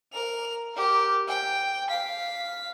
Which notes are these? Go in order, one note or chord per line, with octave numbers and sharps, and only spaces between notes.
A#4 F7
G4 A#4
G5
F5 B6